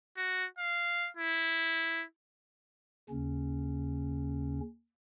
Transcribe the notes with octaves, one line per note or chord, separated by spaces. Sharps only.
F#4
F5
E4
D#2 C#3 C#4